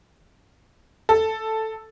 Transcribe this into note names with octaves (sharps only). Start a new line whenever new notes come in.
A4